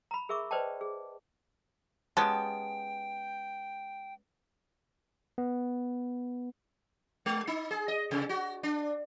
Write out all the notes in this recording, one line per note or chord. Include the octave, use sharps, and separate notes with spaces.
A#5 B5
G#4 A#4 E5 C#6 D6
B4 C5 D5 D#5 G5 A5
G#4
G#3 B3 C#4 G4 G5 A5
B3
G#3
D#4
G#4
D#5
C3
F#4
D4